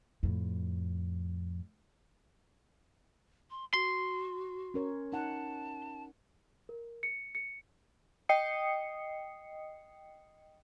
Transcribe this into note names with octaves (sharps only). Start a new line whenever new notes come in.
F2 A2
C6
F#4 C6
C#4 A#4 C#5
D#4 F#5 A5
A#4
C#7
C#7
D#5 G5 D#6 C7 C#7